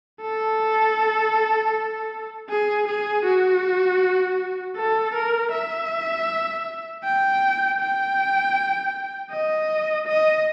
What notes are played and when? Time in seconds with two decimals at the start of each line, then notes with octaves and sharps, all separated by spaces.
0.22 A4
2.50 G#4
2.87 G#4
3.25 F#4
4.76 A4
5.14 A#4
5.52 E5
7.04 G5
7.80 G5
9.31 D#5
10.07 D#5